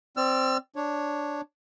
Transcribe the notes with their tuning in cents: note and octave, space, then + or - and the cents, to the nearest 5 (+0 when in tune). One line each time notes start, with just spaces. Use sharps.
C4 +0 D5 +0 E6 +45
D4 +0 C#5 +0